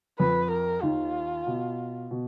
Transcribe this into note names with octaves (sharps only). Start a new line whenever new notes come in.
F2 F3 B4
A#4
D#2 D#3 F4
B2
B2